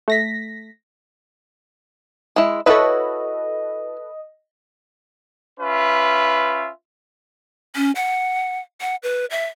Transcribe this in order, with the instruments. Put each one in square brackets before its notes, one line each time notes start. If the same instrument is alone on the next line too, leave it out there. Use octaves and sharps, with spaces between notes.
[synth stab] A3 A#6 B6
[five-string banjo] G#3 E4
[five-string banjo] E4 F#4 C#5 [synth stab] A4 B4 [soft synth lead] D#5
[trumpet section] C#4 F4 B4 E5
[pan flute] C#4
F#5
F#5
B4
E5